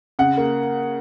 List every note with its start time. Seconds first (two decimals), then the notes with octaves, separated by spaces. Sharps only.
0.19 C#3 F#5
0.38 A#3